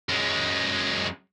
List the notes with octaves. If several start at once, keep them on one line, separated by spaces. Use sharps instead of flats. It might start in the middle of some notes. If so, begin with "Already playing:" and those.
F#2 G#3